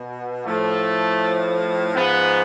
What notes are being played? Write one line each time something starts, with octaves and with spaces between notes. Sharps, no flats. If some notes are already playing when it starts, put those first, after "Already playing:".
Already playing: B2
A2 F3 A3
G#2 F3 B3